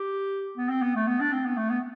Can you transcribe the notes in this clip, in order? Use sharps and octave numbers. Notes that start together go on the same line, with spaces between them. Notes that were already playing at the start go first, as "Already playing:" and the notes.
Already playing: G4
B3
C4
B3
A3
B3
D4
C4
B3
A3
B3